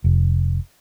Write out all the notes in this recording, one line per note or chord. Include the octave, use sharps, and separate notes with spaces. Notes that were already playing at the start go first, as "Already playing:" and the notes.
F1